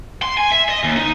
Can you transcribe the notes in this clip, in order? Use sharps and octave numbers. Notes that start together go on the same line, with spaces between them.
C6
G#5
E5
D#5
D#2
D#4